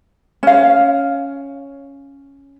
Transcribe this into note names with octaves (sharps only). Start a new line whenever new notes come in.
C#4 F5